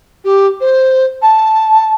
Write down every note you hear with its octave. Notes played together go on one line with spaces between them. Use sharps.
G4
C5
A5